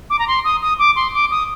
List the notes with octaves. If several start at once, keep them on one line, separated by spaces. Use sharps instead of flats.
D6
A#5
C6
D#6
D#6
D6
C6
D6
D#6